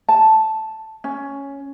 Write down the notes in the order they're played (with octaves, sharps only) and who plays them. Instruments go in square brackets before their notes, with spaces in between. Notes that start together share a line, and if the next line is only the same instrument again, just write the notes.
[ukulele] A5
C#4